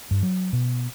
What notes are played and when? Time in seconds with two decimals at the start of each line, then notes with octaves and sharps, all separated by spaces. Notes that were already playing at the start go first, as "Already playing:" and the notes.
0.11 G2
0.22 F#3
0.53 B2